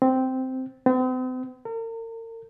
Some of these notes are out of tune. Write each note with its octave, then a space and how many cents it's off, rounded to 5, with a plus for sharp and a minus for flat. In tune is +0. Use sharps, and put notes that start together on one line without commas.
C4 -10
C4 -45
A#4 -40